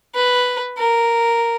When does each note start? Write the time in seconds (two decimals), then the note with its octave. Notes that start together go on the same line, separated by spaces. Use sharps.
0.15 B4
0.78 A#4